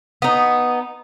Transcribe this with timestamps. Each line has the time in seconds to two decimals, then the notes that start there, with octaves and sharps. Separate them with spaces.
0.22 B3 D#4